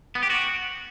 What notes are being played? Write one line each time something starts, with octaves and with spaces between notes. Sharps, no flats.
B3
G4
F#4